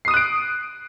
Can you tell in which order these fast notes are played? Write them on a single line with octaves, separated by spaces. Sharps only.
C7 D#6 D#7 F#6 D7